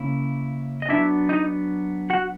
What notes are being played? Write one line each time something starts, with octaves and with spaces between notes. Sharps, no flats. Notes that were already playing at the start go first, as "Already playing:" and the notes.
Already playing: C#3 A#3 C#4 E4
D#5
F#3 B3 D4 E4 E5
D#4 D#5
F#4 F#5